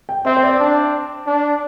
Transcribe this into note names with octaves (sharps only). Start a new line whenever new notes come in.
G5
C4 E5
C5
D5
D4
D4